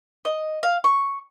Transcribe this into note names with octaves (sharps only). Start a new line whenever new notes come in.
D#5
F5
C#6